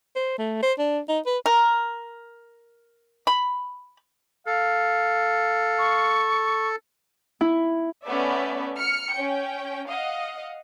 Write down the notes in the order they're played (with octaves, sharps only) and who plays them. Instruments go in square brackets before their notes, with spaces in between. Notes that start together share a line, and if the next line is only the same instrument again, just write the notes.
[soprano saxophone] C5
A3
C5
D4
D#4
B4
[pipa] A#4
B5
[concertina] A4 [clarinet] F5
[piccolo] C#6
[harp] E4
[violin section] A3 B3 C#4 B4 D5 E5
F6 C#7
C#4 G5
D#5 F5 F#5